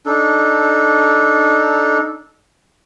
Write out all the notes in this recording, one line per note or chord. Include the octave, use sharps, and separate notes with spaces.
D4 D#4 A4